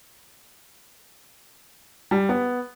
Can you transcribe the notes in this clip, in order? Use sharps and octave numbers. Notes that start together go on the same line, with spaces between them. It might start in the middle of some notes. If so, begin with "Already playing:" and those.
G3
B3